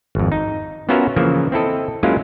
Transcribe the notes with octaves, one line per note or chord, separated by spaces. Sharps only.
G#1 F2
D#4
B3 C#4 F4 F#4 A#4 E5
C#3 E3 F3 A#3 E5
C4 E4 A4 D#5
F#3 G#3 A#3 C#4 E4 F4